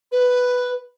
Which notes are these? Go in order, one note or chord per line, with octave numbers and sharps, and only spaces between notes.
B4